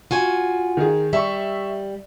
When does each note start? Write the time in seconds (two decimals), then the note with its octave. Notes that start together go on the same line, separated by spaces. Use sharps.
0.11 F4 F#4 G#5
0.77 D#3 G#4
1.13 G3 E5 C#6